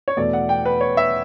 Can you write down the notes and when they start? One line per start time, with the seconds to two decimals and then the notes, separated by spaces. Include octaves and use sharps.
0.08 C#5
0.17 E2 B2 A3 D5
0.33 F#5
0.49 G5
0.65 B4
0.81 C#5
0.97 E5